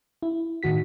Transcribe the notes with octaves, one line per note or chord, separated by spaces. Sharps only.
E4
A2 D#3 F#4 B6